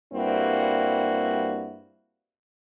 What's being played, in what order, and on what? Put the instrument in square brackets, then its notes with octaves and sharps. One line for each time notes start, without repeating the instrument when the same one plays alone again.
[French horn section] G2 G3 A#3 C4 E4 F#4